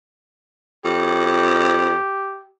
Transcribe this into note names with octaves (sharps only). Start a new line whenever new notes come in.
F2 G4